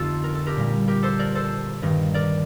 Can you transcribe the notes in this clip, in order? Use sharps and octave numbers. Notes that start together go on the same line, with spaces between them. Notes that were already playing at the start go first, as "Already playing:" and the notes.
Already playing: F2 D3 F3 A3 D#4 F4 G4 A4
A#4
A4
G4 A#4
A#2 G3 A#3
G4 A#4
A4 C5
A#4 D5
A4 C5
G2 D#3 A#3
A#4 D5